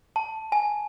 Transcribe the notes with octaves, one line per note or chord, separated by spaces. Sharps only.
A5
G#5